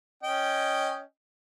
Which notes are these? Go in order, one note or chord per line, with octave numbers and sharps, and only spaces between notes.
C#4 D#5 G5